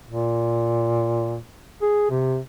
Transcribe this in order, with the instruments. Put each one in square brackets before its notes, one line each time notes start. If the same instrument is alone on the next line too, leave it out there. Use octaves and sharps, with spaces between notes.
[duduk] A#2
G#4
C3